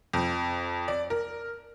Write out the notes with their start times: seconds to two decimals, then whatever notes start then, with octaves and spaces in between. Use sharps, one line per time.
0.13 F2
0.88 D5
1.10 A#4